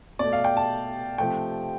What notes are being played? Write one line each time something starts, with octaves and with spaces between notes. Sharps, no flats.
B2 A3 D5
F5
G5
A5
C3 F3 A3 G5